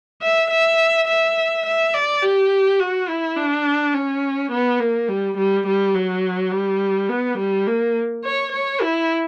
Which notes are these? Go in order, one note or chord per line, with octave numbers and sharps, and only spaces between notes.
E5
E5
E5
E5
D5
G4
F#4
E4
D4
C#4
B3
A#3
G3
G3
G3
F#3
G3
B3
G3
A#3
C#5
C#5
E4